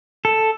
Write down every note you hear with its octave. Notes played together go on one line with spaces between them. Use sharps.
A4